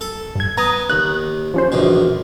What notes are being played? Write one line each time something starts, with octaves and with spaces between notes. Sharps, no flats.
A4
G2 G#6
B3 A#5 D#6
D#2 F#6
F3 C#4 C5
A#1 E2 B2